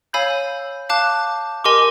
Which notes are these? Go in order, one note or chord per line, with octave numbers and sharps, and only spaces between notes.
C#5 F5 G#5 B5 E6 G6
F5 A5 D6 F#6
G4 A#4 D#5 G#5 C6 D6